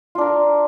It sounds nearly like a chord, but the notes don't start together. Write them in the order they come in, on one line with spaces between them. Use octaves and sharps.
F4 D4 A#4